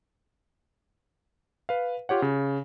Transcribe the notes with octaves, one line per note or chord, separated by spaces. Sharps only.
B4 F5
F4 G4 C#5 F#5
C#3